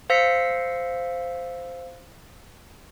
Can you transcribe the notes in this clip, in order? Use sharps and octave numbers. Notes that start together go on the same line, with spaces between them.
C5 F5 E6 A#6 B6 C#7